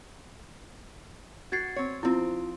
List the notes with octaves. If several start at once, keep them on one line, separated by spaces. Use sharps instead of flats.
F#4 G#6 A6 C7
C4 C#5
F3 C4 E4 F4